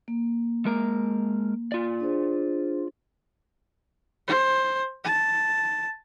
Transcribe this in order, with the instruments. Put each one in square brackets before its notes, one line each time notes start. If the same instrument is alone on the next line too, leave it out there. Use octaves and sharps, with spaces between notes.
[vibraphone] A#3
[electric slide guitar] G#3 A#4 A#5
F4 D5
[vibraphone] D4 G#4 C5
[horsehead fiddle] C5
A5